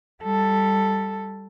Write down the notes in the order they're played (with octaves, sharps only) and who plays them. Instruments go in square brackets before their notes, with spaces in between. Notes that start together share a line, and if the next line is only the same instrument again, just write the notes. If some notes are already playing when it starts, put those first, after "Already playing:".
[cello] G3 A4